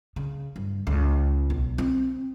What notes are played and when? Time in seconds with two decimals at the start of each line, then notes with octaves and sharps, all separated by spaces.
0.16 C#3
0.56 G2
0.87 C#2
1.50 B1
1.78 C4